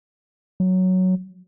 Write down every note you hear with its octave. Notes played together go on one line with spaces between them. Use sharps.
F#3